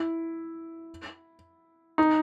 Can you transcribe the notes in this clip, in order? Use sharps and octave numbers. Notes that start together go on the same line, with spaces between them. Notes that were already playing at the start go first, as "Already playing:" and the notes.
Already playing: E4
D#4